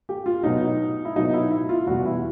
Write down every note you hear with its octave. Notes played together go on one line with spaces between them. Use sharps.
G4
F4
B2 F#3 D#4
E4
B2 F#3 D#4
E4
E4
F4
E2 B2 G3 F#4
E4